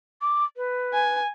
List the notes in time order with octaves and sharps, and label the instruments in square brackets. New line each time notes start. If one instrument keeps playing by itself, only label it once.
[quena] D6
B4
[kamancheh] G#5